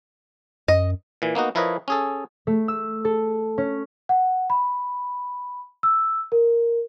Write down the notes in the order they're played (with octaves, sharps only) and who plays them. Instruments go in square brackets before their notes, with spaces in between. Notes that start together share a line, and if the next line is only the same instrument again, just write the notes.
[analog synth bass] F#2 [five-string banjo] D#5
[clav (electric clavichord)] A#2 E3
A#3 B3 D#4 F#4
F3 E4 A#4 B4 C#5 D#5
C#4 G#4 A4
[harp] A3
E6
A4
C#4
[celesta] F#5
B5
E6
A#4